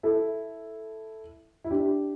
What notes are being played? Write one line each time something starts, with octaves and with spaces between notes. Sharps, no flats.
E4 A4
E4
D4 G4